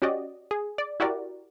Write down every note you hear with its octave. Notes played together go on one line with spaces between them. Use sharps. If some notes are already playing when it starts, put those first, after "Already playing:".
C#4 F#4 G4 D5 D#5
G#4
D5
E4 F#4 G4 A#4 D5